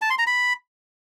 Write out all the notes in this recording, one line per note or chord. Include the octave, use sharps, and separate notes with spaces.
A5
C6
A#5
B5